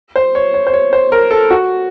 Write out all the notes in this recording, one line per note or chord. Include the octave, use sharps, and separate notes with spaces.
C5
C#5
C#5
C5
C#5
C5
A#4
A4
F#4